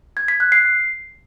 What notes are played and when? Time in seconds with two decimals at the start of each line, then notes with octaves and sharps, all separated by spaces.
0.17 G#6
0.28 B6
0.40 F#6
0.52 C7